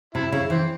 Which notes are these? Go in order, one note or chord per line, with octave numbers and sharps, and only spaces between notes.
C3 E4
C#3 E4
E3 C4